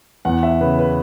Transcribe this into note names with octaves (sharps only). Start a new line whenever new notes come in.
E2 F#5
E5
C#3 B4
B4